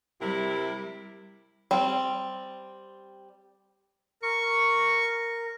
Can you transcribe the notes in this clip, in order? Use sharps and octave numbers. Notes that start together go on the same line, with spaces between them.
C3 G3 E4 A#4
G3 C4
A#4 C#6